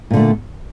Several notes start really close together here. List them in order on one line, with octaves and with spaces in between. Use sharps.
A#2 D3 A3